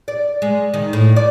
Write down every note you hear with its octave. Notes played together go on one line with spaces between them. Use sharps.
D5
G#3
D#3
A2
D5